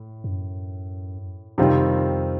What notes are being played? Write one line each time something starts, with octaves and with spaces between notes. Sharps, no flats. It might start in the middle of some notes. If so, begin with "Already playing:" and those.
Already playing: A2
F#2
F2 C3 D#3 G3 C4 F4